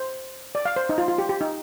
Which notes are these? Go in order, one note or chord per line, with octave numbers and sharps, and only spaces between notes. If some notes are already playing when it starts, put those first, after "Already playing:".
Already playing: C5
D5
F5
C5
D#4
F4
F4
G4
G4
D#4